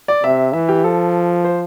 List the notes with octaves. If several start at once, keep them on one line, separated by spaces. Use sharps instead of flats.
D5
C3 E5
E3 E5
G4
F3 A4
C5